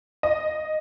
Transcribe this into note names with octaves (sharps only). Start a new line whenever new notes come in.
D#5